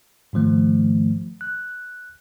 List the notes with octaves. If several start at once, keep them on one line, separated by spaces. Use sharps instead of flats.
G#2 D#3 F3 A3
F#6